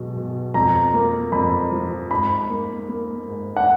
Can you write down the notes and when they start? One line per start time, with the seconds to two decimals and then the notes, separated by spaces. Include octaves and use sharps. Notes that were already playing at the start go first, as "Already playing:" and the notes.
Already playing: B1 B2 G#3
0.17 B2
0.54 F2 A#5
0.94 A#3
1.32 F2 B5
1.71 F3
2.11 G#2 B5
2.50 A#3
2.89 A#3
3.27 G#2
3.57 F#5